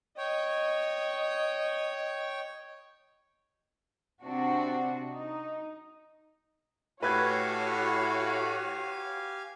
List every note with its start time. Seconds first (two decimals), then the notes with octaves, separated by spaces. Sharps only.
0.18 C#5 D#5 G5
4.23 C3 C4 D4 F#4
5.12 D#4
7.02 A2 F#4 G4 B4 C#5 F5 G#5 G#6